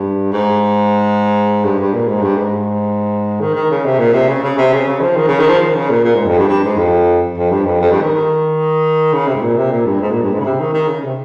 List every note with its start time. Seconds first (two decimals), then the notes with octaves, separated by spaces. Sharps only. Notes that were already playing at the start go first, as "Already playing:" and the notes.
Already playing: G2
0.32 G#2
1.65 G2
1.79 G2
1.94 A#2
2.08 G#2
2.23 G2
2.37 G#2
3.41 D#3
3.55 D#3
3.70 C#3
3.85 C3
3.99 A#2
4.14 C3
4.29 C#3
4.43 C#3
4.58 C3
4.73 C#3
4.88 C#3
5.01 F3
5.16 D#3
5.28 C#3
5.39 D#3
5.49 F3
5.61 D#3
5.75 C#3
5.90 A#2
6.05 A#2
6.15 G#2
6.26 F2
6.38 G2
6.49 G2
6.63 G#2
6.77 F2
7.37 F2
7.51 G2
7.65 F2
7.81 F2
7.91 G2
8.03 D#3
8.14 D#3
9.13 C#3
9.28 C3
9.35 G#2
9.42 A#2
9.57 C3
9.71 A#2
9.86 G2
10.01 G#2
10.12 A#2
10.23 G2
10.33 G#2
10.40 C#3
10.45 C3
10.60 D#3
10.73 D#3
10.88 C#3
11.04 C3